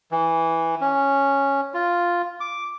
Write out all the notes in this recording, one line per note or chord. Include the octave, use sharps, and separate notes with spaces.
E3
C#4
F4
D6